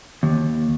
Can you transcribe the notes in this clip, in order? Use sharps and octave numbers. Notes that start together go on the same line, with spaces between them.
D#2